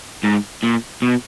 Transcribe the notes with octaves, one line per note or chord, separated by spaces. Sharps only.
G#2
A#2
B2